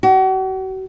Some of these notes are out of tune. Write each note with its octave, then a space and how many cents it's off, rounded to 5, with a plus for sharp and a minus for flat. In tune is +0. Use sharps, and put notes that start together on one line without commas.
F#4 +40